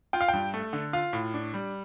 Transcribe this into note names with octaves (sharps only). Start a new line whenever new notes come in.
F4 G5
F5
G2 G5
A3
D3
F4 F5
A2
D4
G3